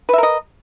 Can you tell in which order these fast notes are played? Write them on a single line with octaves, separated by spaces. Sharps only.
B4 E5 A#4 D#5